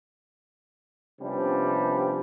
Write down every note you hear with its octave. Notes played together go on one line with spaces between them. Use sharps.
C3 F3 G3 B3 C#4 D4